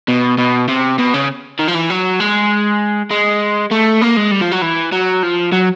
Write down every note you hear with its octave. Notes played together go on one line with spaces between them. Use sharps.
B2
B2
C3
B2
C#3
D#3
F3
E3
F#3
G#3
G#3
A3
A#3
G#3
G3
F3
F#3
E3
F#3
F3
F#3